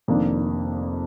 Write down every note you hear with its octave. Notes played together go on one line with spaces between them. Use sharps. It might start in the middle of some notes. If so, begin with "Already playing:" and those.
F1 F2 D#3 A#3 D4